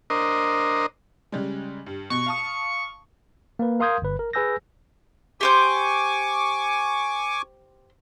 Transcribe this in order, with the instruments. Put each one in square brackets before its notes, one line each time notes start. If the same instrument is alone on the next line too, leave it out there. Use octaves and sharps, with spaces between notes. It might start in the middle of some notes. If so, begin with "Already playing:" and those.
[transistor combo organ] D4 A#4 C5 D#5
[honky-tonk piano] C#3 G3 G#3
G2
[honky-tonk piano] B2 [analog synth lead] C#6
[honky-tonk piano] F5 A5 D#6
[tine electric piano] A#3 B4
A#4 F5 C6 D#6 G6 G#6
G1 B4
A#4
G#4 B4 G#5 E6 G6 A#6
[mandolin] G4 C5 G6 [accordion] G#5 C#6 D6